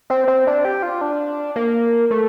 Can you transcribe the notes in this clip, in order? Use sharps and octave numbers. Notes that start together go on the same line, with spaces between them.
C4
C4
D4
G4
F4
D4
A#3
A3